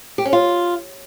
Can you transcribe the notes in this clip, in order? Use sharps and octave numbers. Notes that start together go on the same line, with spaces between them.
G4
C#4
F4